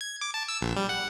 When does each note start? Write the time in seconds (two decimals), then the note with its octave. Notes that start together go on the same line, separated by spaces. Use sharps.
0.01 G#6
0.21 D6
0.34 A5
0.48 E6
0.61 A#1
0.76 G3
0.89 F#5